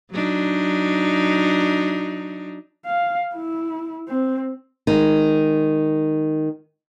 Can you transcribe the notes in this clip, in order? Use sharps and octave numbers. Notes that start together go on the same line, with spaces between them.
F#3 D4 D#4
F5
E4
C4
D#3 G#3